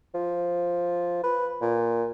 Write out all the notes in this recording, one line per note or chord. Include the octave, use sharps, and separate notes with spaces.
F3
B4
A#2